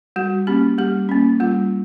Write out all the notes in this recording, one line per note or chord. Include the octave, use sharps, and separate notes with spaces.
G3 F#4
A#3 C#4 G4
G3 G4
A#3 C#4
G3 F4